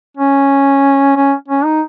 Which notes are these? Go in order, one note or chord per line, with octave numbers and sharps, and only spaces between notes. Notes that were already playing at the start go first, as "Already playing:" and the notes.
C#4
C#4
C#4
D#4